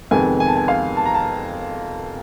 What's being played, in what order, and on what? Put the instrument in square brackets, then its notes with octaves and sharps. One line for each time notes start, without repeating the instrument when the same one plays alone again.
[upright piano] F2 C3 D#3 G#3 B3 G#5
G#5
A5
G#5
F5
A5
A#5
A5